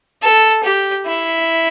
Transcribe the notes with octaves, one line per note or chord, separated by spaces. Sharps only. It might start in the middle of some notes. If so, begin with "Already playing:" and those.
A4
G4
E4